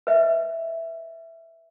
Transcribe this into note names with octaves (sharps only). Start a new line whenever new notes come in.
B4 D#5 E5